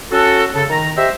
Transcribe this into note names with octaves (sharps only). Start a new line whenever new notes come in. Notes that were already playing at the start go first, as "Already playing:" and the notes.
C#4 F#4 A4
C#3 A4
D#3 A#5
G4 C5 D#5 E5